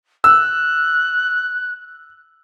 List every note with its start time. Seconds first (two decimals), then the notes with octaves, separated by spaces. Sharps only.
0.24 E6 F#6